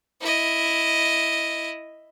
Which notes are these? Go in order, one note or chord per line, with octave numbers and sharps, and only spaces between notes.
E4 D#5